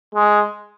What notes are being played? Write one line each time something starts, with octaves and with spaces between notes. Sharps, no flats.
G#3